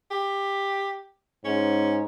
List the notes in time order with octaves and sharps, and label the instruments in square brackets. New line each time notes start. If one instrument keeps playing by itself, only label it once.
[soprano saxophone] G4
[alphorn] G#2 [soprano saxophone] C#4